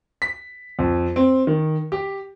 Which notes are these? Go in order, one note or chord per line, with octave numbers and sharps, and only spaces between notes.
B6
F2
C4
D#3
G4